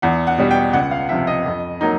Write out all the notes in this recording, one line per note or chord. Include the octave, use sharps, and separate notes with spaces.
E2 F#5
F#5
B2 G3
G5
C#2 F#5
F5
C3 F3 E5
D#5
F2
F#3 A#3 D#4